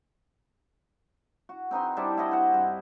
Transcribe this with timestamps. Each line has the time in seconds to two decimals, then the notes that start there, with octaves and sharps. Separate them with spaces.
1.49 F#4
1.71 C4 D#4 B4 C6
1.97 G3 D4 E4 C5
2.17 E4 F#4 D#5 F#5
2.31 C5 F#5
2.54 G2